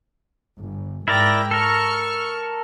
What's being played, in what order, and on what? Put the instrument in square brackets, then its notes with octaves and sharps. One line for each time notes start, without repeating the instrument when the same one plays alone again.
[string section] G1
[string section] G#2 G5 A#6 [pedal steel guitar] E4 A#4 D5
[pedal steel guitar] A4 A#4 [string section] C#6 F6